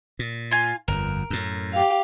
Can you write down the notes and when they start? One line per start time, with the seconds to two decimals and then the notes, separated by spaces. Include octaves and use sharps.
0.19 A#2
0.51 F4 G#5
0.88 G1 F2 A#4
1.30 F#2 A2
1.72 G4 F5